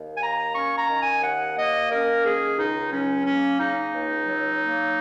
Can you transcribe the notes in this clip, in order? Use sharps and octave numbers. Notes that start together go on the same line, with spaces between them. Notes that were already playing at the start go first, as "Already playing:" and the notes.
Already playing: D#2
G#5
A#3 A#5
C#4 C#6
A#5
D#3
G#5
D#2 F#5
A#3 D#5
C#4 A#4
D#3 G#4
C#2 D#4
F#3 C#4
A#3 C#4
C#3 D#4
C#2
F#3
A#3